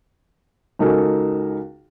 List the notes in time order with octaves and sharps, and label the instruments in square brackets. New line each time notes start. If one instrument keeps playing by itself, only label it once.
[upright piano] C#2 D#4 F#4 A4 A#4 G#5